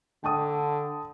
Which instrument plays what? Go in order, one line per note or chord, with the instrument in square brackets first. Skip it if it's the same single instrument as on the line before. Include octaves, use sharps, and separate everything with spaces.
[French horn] D3 [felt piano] G5 A5 D#6